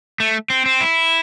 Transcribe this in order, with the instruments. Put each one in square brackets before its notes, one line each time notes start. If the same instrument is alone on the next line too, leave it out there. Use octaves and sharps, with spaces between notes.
[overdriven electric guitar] A3
C4
C4
E4